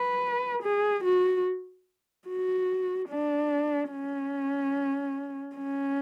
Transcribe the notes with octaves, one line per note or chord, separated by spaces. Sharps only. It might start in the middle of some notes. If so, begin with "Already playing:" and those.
Already playing: B4
G#4
F#4
F#4
D4
C#4
C#4